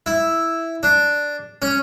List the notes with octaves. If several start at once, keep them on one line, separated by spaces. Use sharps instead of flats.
E4
D4
C#4